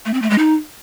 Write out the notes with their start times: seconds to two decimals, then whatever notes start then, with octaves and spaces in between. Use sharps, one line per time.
0.05 A3
0.14 C4
0.22 A3
0.30 G#3
0.38 D#4